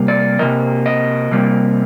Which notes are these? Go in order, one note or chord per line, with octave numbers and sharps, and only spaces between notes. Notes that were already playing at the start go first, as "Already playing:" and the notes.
Already playing: C3 G3 A#3
D5
C3 G3 A#3 D#5
D#5
C3 G3 A#3